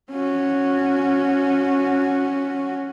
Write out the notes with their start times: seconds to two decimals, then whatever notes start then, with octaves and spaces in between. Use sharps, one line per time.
0.11 C#4 F#4